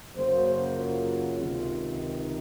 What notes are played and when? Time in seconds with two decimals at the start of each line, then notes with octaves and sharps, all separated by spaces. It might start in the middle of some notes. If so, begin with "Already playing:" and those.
0.14 F#2 C#3 F#3 A#3 C5
0.44 C5
0.76 F4
1.37 C#2 C3 D#3
1.99 D#4